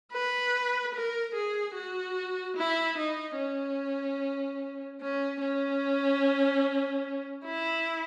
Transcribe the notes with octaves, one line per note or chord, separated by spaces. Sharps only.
B4
A#4
G#4
F#4
E4
D#4
C#4
C#4
C#4
E4